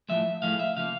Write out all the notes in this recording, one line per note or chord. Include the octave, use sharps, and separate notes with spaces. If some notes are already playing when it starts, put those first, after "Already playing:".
A2 F3 G#3 E5
A2 F3 G#3 F5
E5
C#3 F3 A#3 F5